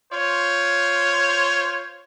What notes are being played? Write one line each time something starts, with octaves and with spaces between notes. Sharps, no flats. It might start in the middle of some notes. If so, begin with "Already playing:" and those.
F4 C5 C#5